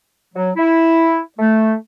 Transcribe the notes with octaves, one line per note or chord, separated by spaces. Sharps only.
F#3
E4
A3